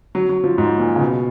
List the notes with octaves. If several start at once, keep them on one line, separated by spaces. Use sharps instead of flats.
F#3
F#3
F3
G#2
A#2
C#3
B2